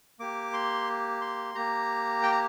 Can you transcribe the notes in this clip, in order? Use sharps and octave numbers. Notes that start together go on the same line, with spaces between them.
A#3 G4 D6
C6
C6
A#3 G4 A#5
G5
A#5